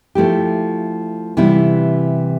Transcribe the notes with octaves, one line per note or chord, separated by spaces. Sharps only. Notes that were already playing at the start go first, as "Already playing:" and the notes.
F3 A3 E4 G4
C3 E3 G3 B3 E4